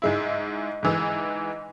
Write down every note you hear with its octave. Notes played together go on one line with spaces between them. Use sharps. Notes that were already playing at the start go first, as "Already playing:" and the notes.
G#2 G#3 E4
G#2 E3 G#3